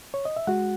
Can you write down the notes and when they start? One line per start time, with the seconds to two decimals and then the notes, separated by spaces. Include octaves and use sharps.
0.14 C#5
0.25 D#5
0.37 E5
0.47 G#3 F#4 F#5